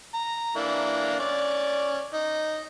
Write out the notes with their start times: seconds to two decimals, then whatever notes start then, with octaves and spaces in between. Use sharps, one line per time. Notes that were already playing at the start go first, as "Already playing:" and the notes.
0.14 A#5
0.56 E3 A#3 D4
1.19 C#4 D5
2.14 D#4